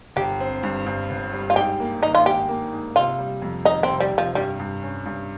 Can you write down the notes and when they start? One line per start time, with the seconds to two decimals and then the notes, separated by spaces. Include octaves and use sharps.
0.16 G1 G4
0.40 C4
0.63 G2
0.86 G2
1.10 G1
1.33 G3
1.50 F4
1.56 G#2 G4
1.80 A#3
2.03 D#3 D#4
2.15 F4
2.25 G#2 G4
2.49 A#3
2.73 G#2
2.96 C3 F4
3.19 G3
3.42 F2
3.65 D#3 D#4
3.83 C4
3.89 C3
4.00 G3
4.12 C3
4.18 F3
4.35 G2 G3
4.59 G2
4.82 C#4
5.06 G2